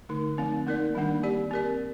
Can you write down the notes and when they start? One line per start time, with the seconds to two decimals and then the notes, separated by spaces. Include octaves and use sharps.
0.09 D3 A3 D#4
0.37 F3 A3 C4 D#4
0.67 A#3 D#4 A#4 D5
0.95 D#3 G3 A#3 D4
1.23 C4 G4 D5
1.51 C4 G4 A#4 D5